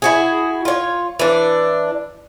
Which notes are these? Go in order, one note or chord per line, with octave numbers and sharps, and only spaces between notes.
E4 F#4 G#4
F4 C#5
E3 D4